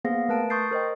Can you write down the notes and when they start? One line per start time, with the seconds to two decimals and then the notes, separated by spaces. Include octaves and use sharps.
0.05 A#3 B3 G#4 C5 F5 A#6
0.29 A3 A#4 B4 A5 D7
0.50 C6 C#6 D#6 G6 A6 C7
0.71 A#4 C5 D#5 G5